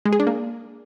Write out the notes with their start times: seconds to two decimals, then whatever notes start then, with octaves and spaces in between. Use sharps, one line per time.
0.06 G#3
0.13 G#4
0.20 D4
0.27 A#3